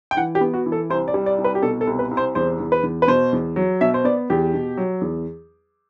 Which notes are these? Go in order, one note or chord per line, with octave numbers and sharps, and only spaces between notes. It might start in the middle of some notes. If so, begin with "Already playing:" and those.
G5
E3 F#5
G4
B3
F#4
E3
A4
C2 C5
D5
G3
D5
C2
B4
G4
B2 A4
A4
C2
B4
C2
C5
E2 C5
E2
B4
E2
B4
B2 C5
E2
F#3
B2 E5
C5
B3 D5
E2 G4
B2
F#3
E2